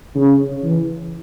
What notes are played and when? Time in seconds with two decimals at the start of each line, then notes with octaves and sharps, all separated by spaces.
0.16 C#3
0.64 E3